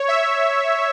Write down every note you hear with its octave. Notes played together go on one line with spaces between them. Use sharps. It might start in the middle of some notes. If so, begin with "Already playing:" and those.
Already playing: C#5
E5